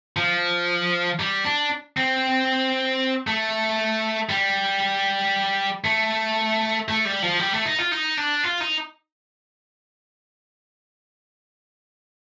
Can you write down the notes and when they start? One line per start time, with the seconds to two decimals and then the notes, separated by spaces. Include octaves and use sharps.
0.17 F3
1.20 G3
1.45 D4
1.97 C4
3.27 A3
4.29 G3
5.85 A3
6.89 A3
7.05 G3
7.22 F3
7.39 G3
7.53 A3
7.65 D#4
7.78 F4
7.92 D#4
8.17 D4
8.44 F4
8.61 D#4